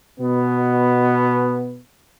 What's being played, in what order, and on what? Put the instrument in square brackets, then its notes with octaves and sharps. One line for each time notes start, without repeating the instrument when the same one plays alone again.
[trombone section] B2 B3